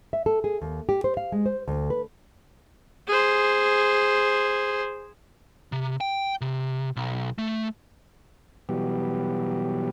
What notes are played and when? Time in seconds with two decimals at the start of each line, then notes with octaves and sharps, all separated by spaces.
0.13 E5
0.26 A4
0.44 G#4
0.62 D#2
0.89 G4
1.04 C5
1.17 F5
1.32 G#3
1.46 C5
1.68 D2
1.90 B4
3.07 G#4 C5
5.72 C3
6.01 G5
6.41 C3
6.96 B1
7.38 A3
8.69 B2 E3 F#3 G3 B3 G4